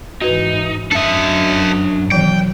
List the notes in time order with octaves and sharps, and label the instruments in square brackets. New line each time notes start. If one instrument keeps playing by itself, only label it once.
[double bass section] G#2 E3 [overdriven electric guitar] D#4 [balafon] F#4 B4
[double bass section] F#2 F#3 [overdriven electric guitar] D4 E5 [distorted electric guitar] A4 D#5
[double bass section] B2 [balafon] D#3 E3 F#3 [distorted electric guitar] G5